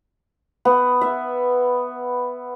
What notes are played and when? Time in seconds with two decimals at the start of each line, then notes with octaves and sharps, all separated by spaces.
0.65 B3
1.01 E5